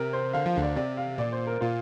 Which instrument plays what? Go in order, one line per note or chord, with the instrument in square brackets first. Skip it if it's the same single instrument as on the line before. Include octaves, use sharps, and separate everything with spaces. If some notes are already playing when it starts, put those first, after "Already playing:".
Already playing: [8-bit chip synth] C3 [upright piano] A#4
[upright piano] C5
[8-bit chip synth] D3 [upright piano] F5
[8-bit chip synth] F3 [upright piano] F5
[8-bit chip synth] D2 D3
[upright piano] D5
[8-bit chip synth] C3 [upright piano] D5
[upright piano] F5
[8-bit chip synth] A#2 [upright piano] D5
[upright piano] C5
A#4
[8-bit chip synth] A#2 [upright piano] F4